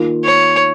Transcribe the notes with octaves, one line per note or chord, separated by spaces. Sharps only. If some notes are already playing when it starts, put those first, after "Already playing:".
Already playing: D#3 A#3 F4
C#5